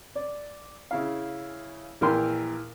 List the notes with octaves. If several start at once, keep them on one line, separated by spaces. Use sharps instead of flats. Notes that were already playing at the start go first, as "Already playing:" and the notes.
D5
C#3 E4 F5
A#1 E3 A#4 G5 C6